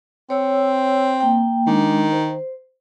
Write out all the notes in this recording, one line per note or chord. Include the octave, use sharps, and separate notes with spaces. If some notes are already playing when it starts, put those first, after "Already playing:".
C4 C#5 E6
A#3 G5
D#3 G#3 D4
C5